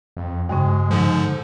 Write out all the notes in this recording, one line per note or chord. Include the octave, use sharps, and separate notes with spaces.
F2
G2 C#3 G#3
G#2 D3 F3